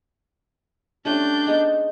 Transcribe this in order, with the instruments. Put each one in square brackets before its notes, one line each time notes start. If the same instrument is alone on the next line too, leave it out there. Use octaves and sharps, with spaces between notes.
[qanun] G3 A3 C#4 [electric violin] D4 G6
[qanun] G#3 B3 D#4